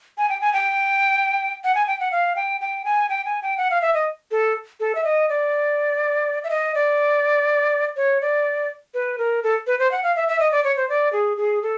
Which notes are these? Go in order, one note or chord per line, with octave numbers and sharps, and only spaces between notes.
G#5
G5
G#5
G5
F#5
G#5
G5
F#5
F5
G5
G5
G#5
G5
G#5
G5
F#5
F5
E5
D#5
A4
A4
E5
D#5
D5
E5
D#5
D5
C#5
D5
B4
A#4
A4
B4
C5
F#5
F5
E5
E5
D#5
D5
C#5
C5
D5
G#4
G#4
A4